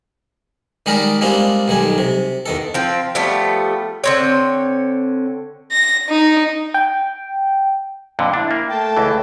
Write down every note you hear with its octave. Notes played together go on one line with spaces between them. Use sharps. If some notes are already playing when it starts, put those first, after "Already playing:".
D#3 G3 G#3 G4 A#4 D5
G3 G#3 A#3 C4 D4 F4
B1 D#3 G3 G#5
C3
E2 D#3 A4
F3 C4
F3 G3 A3 B3
D3 C4 C#5
A#6
D#4
G5
F2 A#2 D3
D4 E4
A#3
A3 G5 A5
C#2 E3